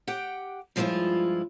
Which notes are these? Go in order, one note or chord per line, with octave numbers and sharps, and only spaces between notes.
G4 F#5 G5
G2 F3 G#3 C#4 E4 F4